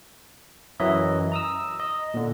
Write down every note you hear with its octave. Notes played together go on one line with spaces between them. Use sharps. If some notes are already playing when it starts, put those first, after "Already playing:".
F#2 E3 F#3 E4 D#5 E5
A#5 D#6 E6
D#5
A#2 D3